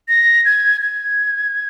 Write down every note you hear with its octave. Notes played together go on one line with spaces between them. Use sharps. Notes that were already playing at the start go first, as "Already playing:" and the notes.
A#6
G#6
G#6